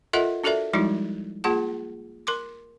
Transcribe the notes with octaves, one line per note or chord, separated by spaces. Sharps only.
F4 A4 A#4 D#5 E5 F#5
D4 F#4 A4 A#4 D5 E5
F3 G3 G#3 D#4 E4 F#4
A#3 F4 G#4 F#5 A5
A#4 C6 D6